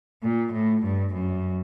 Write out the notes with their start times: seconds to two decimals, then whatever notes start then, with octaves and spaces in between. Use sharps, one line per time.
0.23 A#2
0.52 A2
0.83 G2
1.13 F#2